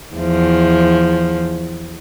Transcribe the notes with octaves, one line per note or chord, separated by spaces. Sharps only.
E2 F3